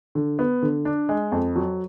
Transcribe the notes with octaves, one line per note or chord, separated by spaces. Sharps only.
D3
B3
D3
D4
G#3
F2
F#3